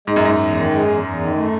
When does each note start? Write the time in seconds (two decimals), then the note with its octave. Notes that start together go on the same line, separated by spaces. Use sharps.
0.07 G#2 G#3
0.16 F#2
0.24 E2 G#2
0.40 E2
0.55 D#3
0.72 G#3
0.88 E2
1.04 E2
1.20 D#3
1.36 A3